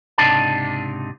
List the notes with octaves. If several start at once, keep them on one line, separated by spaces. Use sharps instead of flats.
C#2 G#2 C3 D4 D#4 A5